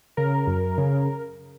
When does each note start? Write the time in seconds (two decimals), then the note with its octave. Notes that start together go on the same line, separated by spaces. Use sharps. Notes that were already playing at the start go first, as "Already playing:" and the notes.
0.17 C#3 A#4
0.47 F#2
0.78 C#3